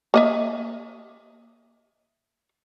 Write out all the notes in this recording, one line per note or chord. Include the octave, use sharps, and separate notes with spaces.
A#3 D#5 E5